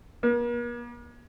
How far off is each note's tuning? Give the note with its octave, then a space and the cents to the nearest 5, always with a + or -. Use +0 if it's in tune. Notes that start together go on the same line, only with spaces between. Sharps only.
A#3 +45